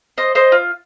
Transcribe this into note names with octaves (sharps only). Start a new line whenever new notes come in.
C5 D#5
C5 D#5
F4